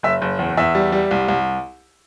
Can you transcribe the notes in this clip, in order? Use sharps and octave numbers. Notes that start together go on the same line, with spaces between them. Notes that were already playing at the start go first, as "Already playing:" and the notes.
F#1 E5
F#1
E2
E2 E5
G3
G3
C2
C2